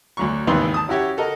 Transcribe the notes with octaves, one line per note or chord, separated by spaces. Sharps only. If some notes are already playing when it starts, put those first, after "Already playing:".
D2 F#3 C#6
G#1 D#2 D#3 E3 B4 C6
A5 D#6
C#4 E4 F#4 G4 C#5
F#4 A4 A#4 D#5